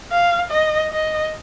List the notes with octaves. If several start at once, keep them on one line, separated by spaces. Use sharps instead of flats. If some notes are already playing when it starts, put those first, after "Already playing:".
F5
D#5
D#5